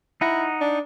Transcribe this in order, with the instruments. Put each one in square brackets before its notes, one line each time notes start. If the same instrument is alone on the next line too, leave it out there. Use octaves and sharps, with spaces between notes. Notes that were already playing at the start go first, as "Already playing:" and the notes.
[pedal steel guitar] D#4 F#5 A#5 [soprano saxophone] E4
[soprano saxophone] D4